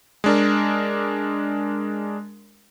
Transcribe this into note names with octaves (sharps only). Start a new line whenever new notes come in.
G#3 D4 A#4